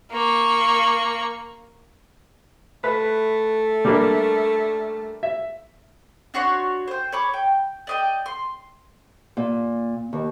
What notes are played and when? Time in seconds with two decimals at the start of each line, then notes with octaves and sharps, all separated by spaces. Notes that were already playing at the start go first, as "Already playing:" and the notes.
0.12 A#3 C#6
2.84 A3 B4
3.85 G3 A#3 D4
5.23 E5
6.34 D4 F#4 C#5 C6
6.88 C5 G5
7.12 C#5 B5 D6
7.34 G5
7.87 D5 D#5 G5
8.26 C6
9.37 A#2
10.13 D#2